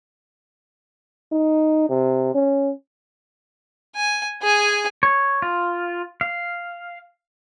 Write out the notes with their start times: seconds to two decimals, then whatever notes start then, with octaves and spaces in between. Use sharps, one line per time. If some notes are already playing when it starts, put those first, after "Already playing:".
1.32 D#4
1.89 C3
2.34 C#4
3.95 G#5
4.42 G#4 G#5
5.03 C#5
5.42 F4
6.21 F5